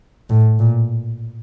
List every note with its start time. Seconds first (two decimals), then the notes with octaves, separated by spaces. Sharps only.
0.30 A2
0.59 A#2